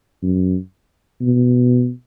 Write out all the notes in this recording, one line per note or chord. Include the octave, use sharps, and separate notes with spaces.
F#2
B2